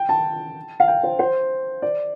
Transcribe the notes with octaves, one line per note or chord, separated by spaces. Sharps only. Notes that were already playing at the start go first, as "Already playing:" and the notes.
Already playing: G5
A5
F5
G5
C5
C5
D5